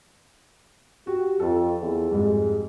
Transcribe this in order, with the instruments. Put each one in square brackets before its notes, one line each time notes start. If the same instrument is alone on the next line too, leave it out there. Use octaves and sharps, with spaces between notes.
[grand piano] F#4 [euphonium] G4
[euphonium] F2 [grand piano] F4 A4
[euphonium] E2
[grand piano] F2 G#2 G3 [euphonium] G#3